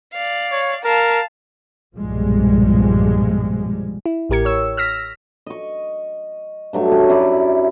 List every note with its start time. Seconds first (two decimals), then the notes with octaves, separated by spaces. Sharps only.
0.13 D5 F5
0.51 C#5
0.85 A#4 F5 A5
1.96 B1 G2 A#2 F3 G3 G#3
4.06 E4
4.29 A1 A2 G4 A#4 G#6 C#7
4.45 C#5 E6
4.77 E6 F6 A#6 B6
5.47 D#5 C#6
6.73 G2 F#3 A3 C#6
6.92 C#5 G5 G#5 C#6
7.09 F#2 E4 D5